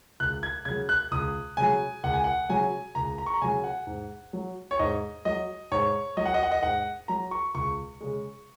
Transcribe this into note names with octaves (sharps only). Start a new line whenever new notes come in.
C#2 F#6
G#6
C#3 F#3 G#6
F#6
C#2 D#6
C#3 F#3 G#5
C#2 F#5
G#5
F#5
C#3 F#3 G#5
C#2 A#5
A#5
C#6
A#5
C#3 F#3 G#5
F#5
G#2
F#3
C#5
G#2 D#5
F#3 D#5
G#2 C#5
F#3 D#5
F#5
D#5
F#5
D#5
G#2 F#5
F#3 A#5
C#6
C#2 C#6
C#3 G#3